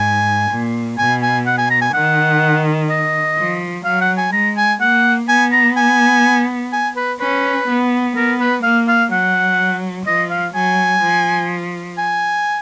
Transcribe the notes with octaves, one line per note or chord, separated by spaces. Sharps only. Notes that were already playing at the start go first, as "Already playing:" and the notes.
Already playing: G#2 G#5
A#2
B2 G#5
G#5
F#5
G#5
A#5
G#5
D#3 F#5
D#5
F3
F#3 F5
F#5
G#5
G#3 A#5
G#5
A#3 F#5
B3 G#5
A#5
G#5
G#5
B4
C#4 B4
B3
B3 A#4
B4
A#3 F5
F5
F#3 F#5
F3 D#5
F5
F#3 G#5
F3
G#5